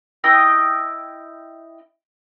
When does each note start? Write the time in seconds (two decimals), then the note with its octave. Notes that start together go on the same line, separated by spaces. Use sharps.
0.24 E4 D#5 G5 D#6